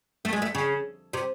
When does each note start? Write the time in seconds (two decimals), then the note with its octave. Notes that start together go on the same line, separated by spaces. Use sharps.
0.25 A3
0.33 G#3
0.42 A3
0.55 C#3
1.13 C3